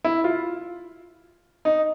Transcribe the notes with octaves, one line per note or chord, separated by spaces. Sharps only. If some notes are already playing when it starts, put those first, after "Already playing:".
E4
F4
D#4